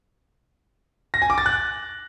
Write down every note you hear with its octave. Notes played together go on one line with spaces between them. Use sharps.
A#6
G#5
D6
A6
F#6